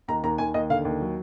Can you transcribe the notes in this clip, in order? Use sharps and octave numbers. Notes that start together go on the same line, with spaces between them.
D#2 A#5
D#2 A#5
D#2 G#5
D#2 D#5
D3 F5
D#2
F#3